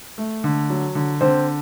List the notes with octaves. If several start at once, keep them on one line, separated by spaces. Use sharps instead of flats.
A3
D3
F#3
D3
D3 C4 C5